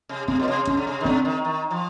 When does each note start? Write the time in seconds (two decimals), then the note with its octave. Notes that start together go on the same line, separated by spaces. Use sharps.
0.09 C3
0.28 C3 C4
0.39 A#2
0.48 C3
0.67 C3 C#4
0.77 C#3
0.87 C3
1.01 D#3
1.05 C#3 C4
1.25 D#3
1.45 D#3
1.71 F3